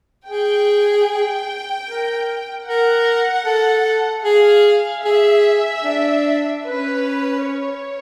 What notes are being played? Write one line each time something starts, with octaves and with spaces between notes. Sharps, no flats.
G#4 G5
G5
A#4
A#4 F#5
A4
G#4 F5
G#4 E5
D4
C#4 B4
C#5